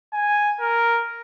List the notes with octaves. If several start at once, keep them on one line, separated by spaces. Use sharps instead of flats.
G#5
A#4